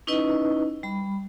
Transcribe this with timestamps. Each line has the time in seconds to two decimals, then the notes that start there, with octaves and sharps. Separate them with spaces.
0.07 C#4 D#4 E4 B4 D#5
0.83 G3 B5